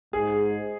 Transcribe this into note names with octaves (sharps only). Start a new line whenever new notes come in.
G#2 G#4